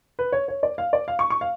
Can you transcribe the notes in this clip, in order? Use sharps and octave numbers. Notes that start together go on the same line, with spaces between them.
B4
C#5
C#5
D5
F5
D5
F5
C#6
C#6
F5